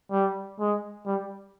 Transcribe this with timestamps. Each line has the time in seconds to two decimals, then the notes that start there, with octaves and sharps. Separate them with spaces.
0.11 G3
0.59 G#3
1.06 G3